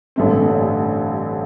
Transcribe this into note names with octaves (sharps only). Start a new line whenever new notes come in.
A1 G2 D3 A3 C4